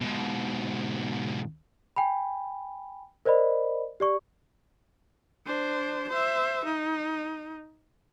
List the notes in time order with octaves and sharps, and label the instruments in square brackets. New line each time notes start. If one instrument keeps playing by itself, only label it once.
[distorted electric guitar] G#2 B2
[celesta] G5 G#5 B5
A#4 C5 D5 D#5 B5
G4 D5 C#6
[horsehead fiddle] D4 C5
C5 E5
D#4